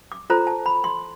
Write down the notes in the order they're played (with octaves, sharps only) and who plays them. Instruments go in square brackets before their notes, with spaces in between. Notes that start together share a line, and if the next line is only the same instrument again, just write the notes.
[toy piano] D6
F4 A4 C5 A#5
A5
B5
C6